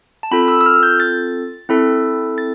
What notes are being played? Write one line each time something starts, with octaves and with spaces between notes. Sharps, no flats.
A5
C4 F4 A4 B5
E6
E6
F6
G6
A6
C4 E4 A4
A6